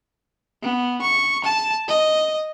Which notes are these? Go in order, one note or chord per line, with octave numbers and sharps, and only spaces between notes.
B3
C#6
A5
D#5